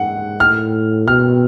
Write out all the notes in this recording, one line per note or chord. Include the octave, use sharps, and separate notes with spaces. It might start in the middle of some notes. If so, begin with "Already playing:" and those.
Already playing: G#2 F#5
A2 F6
B2 F6